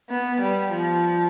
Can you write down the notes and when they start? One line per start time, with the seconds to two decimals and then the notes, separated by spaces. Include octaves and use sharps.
0.10 B3
0.41 G3
0.72 F3